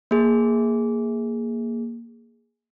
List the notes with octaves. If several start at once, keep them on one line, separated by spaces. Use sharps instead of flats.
A#3 G#4